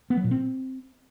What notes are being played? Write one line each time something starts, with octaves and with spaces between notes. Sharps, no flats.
B3
F#3
A#2
C4